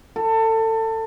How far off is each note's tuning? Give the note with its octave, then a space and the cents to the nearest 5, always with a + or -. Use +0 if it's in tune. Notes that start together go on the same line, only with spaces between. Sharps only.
A4 +25